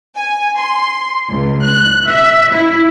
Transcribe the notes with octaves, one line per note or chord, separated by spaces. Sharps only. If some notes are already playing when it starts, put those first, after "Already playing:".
G#5
C6
C#2
F#6
E5
E4